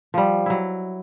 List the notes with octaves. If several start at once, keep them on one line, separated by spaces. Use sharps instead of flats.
F3 G3
F#3 E4